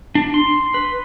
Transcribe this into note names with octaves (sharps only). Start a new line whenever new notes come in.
D4
C6
B4